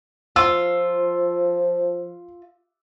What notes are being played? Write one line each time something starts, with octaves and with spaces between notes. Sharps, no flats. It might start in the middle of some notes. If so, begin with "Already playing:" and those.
F3 F4 E6